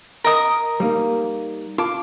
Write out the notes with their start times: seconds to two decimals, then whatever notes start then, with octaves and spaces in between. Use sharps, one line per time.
0.24 A#4 D#5 D#6
0.80 G3 A#3 D#4
1.78 F4 A5 D6